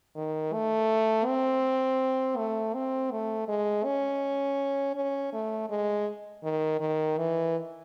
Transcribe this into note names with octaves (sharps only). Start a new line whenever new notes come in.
D#3
A3
C4
A3
C4
A3
G#3
C#4
C#4
A3
G#3
D#3
D#3
E3